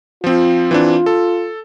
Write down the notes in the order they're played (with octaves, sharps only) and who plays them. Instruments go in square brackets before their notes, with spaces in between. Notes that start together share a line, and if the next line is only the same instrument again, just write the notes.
[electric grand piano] F3 C4 [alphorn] F4
[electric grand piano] E3 C4 D4
A4